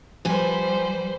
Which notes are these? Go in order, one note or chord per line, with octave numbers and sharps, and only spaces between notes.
F3 G3 B4 C5 G#5